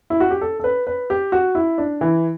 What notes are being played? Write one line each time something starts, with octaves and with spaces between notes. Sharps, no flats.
E4
F#4
G4
A4
A4
B4
B4
G4
F#4
E4
D4
E3